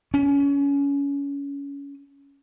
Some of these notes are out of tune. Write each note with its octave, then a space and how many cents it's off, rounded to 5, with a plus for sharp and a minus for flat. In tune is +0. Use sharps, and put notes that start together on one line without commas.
C#4 +25